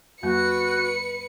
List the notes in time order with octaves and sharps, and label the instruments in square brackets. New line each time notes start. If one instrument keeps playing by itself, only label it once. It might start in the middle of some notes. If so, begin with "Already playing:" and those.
[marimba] F2 F#3 A#3 [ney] F#4 [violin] B4 C#7